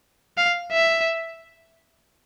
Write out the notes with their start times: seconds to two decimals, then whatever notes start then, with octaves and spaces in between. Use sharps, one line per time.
0.38 F5
0.72 E5